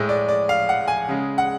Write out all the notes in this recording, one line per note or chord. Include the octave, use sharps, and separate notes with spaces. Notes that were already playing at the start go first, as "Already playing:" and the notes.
Already playing: A2 G#3
D5
D5
F5
F#5
G#5
C#3 G#3
F#5